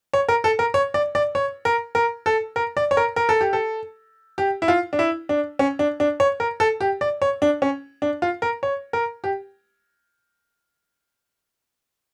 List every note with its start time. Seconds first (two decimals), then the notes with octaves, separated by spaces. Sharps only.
0.14 C#5
0.29 A#4
0.44 A4
0.59 A#4
0.74 C#5
0.94 D5
1.15 D5
1.35 C#5
1.65 A#4
1.95 A#4
2.26 A4
2.56 A#4
2.77 D5
2.91 C#5
2.97 A#4
3.16 A#4
3.29 A4
3.41 G4
3.53 A4
4.38 G4
4.62 E4
4.68 F4
4.93 D4
4.99 E4
5.29 D4
5.59 C#4
5.79 D4
6.00 D4
6.20 C#5
6.40 A#4
6.60 A4
6.81 G4
7.01 D5
7.22 C#5
7.42 D4
7.62 C#4
8.02 D4
8.22 F4
8.42 A#4
8.63 C#5
8.93 A#4
9.24 G4